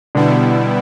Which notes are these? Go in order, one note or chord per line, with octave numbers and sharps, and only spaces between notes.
B2 D3 G3 B3 E4